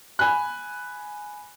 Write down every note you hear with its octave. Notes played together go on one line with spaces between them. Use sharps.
G#5 B5 F#6